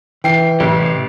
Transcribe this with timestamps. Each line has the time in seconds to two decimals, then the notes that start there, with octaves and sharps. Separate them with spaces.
0.24 E3 G5 C7
0.60 A1 C3 G4